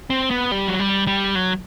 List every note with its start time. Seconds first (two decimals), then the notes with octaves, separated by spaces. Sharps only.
0.10 C4
0.31 B3
0.51 G3
0.68 F#3
0.80 G3
1.07 G3
1.35 F#3